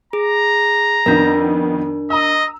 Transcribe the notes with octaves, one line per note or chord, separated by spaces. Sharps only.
G#4 A#5
F2 D#3 B3 D4 A#4
D#5 A#5 E6